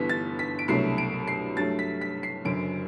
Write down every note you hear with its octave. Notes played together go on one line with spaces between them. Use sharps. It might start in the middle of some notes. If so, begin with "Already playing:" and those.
Already playing: G1 G2 E3 B3 B6
A6
B6
D7
C2 B2 F#3 A3 D4 C7
D7
C7
G2 F#3 A3 A6
B6
B6
C7
F#1 F#2 D3 F#3 D7